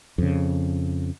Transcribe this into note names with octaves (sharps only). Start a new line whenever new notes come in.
F2 C#3